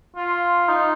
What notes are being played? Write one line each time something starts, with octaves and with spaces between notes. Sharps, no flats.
F4
D#4